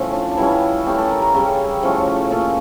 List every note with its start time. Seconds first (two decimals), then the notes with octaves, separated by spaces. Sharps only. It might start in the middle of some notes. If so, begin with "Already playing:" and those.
Already playing: A2 F3 C#4
0.13 D4
0.31 D4
0.37 E3 G3 C#4 E4
0.86 E3 A3 C#4 G4
0.98 A4
1.11 A#4
1.22 A#4
1.34 C#3 G3 C#4 A4
1.83 A2 F3 A3 C#4
2.31 A#2 A3 C#4 A4